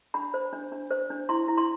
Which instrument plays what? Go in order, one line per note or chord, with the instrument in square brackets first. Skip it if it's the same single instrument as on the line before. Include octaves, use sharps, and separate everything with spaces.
[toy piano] D4 B5
C5
D4
D4
C5
D4
E4 C6
E4
C6